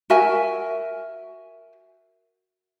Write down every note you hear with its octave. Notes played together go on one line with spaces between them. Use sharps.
F#4 A#4 E5 G#5